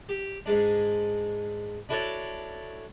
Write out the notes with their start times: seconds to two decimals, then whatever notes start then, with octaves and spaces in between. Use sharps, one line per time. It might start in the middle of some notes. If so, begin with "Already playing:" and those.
0.09 G4
0.46 G#2 G#3 D4
1.89 D4 E4 F#4 A4 C#5 D5